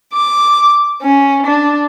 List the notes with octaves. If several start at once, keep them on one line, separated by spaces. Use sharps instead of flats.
D6
C#4
D4